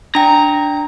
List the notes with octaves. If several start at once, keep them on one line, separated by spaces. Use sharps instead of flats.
D4 G5 A#5